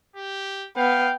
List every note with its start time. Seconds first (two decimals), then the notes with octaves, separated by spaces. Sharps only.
0.16 G4
0.77 B3 F5 G5